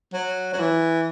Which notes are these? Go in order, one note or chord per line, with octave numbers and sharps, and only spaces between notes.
F#3
F#3
E3